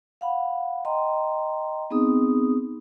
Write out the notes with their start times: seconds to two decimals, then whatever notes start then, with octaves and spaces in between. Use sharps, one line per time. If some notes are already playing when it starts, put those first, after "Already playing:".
0.21 F5 F#5 B5
0.85 D#5 G5 A#5 C6
1.91 B3 C4 D#4 G#4 D#6